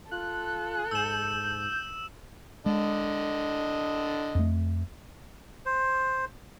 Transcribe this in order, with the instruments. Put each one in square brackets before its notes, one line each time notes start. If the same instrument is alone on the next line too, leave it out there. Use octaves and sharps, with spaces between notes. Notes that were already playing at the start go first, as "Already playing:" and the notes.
[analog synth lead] F4 [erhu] A4 [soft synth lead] F#6
[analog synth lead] G#2 [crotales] E6 E7 [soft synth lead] G6
[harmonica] D3 D#5 [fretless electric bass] G#3
[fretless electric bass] F2 A3
[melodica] C5